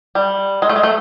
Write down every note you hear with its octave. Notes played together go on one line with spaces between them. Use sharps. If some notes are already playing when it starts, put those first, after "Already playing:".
G3
G#3
A3
G#3
A3